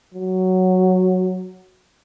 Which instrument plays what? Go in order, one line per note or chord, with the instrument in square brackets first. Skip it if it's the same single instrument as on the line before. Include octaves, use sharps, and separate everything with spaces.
[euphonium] F#3